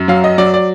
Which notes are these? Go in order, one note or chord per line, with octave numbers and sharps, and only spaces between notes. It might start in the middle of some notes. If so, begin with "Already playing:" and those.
Already playing: F#2
F#3 F5
D#5
F#3 D5
D5